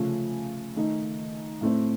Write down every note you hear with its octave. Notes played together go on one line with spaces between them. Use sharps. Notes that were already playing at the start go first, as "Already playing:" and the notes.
Already playing: C#3 F3 A3 C#4
D#3 A3 D#4
A2 A3 C4